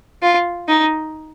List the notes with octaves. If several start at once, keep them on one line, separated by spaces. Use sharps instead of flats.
F4
D#4